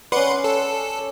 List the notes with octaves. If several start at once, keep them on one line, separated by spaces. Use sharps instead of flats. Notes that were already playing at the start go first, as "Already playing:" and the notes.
C#4 B4 D5 F#5 C6
A4